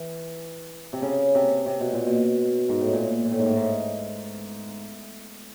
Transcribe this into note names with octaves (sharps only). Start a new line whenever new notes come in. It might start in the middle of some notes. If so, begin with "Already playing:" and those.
Already playing: E3
C3
C#3
C3
C3
B2
A#2
B2
G#2
A2
A#2
A#2
A2
G#2
A2
G#2